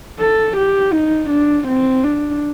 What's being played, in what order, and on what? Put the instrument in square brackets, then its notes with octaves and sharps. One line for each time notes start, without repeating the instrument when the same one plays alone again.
[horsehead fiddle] A4
G4
D#4
D4
C4
D4